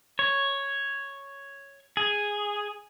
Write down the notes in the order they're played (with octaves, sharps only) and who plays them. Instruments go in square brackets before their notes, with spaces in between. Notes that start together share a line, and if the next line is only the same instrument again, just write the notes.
[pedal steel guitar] C#5
G#4